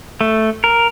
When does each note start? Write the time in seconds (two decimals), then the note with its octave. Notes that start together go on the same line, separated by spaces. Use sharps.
0.21 A3
0.64 A#4